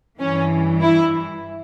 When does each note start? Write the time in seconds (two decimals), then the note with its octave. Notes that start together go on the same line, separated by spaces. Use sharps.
0.19 G2 E3 C#4
0.82 E4